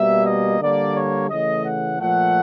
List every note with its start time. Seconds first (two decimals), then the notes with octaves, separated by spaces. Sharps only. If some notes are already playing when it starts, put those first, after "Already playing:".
Already playing: B2 G3 A#3 E5
0.26 D#5
0.61 D3 G3 A#3 D5
0.95 C#5
1.30 C#3 E3 A3 D#5
1.64 F#5
1.99 A#2 F3 A3 F#5